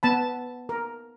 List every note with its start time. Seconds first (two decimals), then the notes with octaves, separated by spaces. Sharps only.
0.03 B3 A5 B5
0.69 A#4